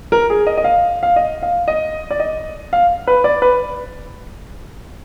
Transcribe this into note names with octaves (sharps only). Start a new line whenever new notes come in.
A#4
G#4
D#5
D#5
F5
F5
D#5
F5
D#5
D5
D#5
F5
B4
D5
B4